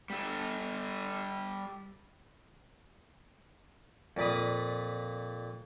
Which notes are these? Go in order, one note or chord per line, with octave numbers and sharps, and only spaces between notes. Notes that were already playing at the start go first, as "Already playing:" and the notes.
G3 A4
F2 A#2 D5 B5 D#6